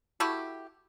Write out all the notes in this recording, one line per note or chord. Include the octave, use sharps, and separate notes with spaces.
A3 E4 F#4 G4